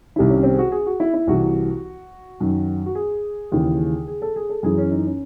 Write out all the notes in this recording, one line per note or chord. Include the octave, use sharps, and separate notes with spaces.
C2 C3 D#3 E4
C#4
C4
G#4
F#4
G#4
F#4
E4
E4
C2 C3 E3 F#4
F#2 D#3
F#4
G#4
D#2 C#3 E3
G#4
A4
G#4
A4
F#2 E3 G#4
C#4
D#4
C#4